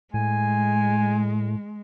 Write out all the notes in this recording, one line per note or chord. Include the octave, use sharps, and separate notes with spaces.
A2 G#3 G#5